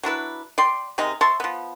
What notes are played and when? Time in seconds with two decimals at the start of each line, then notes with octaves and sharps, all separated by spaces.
0.03 F#3 D4 E4 B4
0.58 D5 G5 C6
0.98 C3 D#3 G#3 D#4
1.21 C#5 E5 A5 C6
1.40 F3 B3